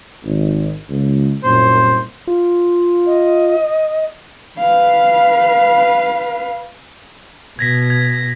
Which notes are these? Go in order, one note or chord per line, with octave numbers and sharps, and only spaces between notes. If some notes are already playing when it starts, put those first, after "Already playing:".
G#1
C#2
C2 F#2 A#2 C5
F4
D#5
B4 F5
B2 G#6 A#6 B6
G#6